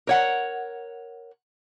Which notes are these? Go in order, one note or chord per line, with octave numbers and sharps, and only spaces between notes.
A#4 C#5 F#5